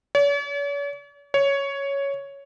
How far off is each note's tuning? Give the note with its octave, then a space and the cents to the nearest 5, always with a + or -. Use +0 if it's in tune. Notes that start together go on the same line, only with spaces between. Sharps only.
C#5 +45
C#5 +5